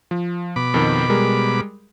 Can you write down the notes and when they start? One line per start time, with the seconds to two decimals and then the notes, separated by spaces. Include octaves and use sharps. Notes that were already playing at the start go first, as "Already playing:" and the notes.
0.11 F3
0.56 B2 B5 D6
0.74 F2 D#3
1.10 G3 G#3 A#4